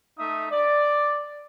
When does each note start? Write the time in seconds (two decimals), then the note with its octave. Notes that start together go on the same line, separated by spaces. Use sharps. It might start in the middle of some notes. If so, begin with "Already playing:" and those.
0.18 A3 D#4 E5 D#6
0.51 D5